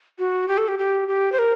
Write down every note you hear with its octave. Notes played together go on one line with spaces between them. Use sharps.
F#4
G4
A4
G4
G4
G4
C5
A#4